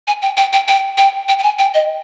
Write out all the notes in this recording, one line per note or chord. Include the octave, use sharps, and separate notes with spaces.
G#5
G5
G5
G5
G5
G5
G5
G5
G#5
G5
D#5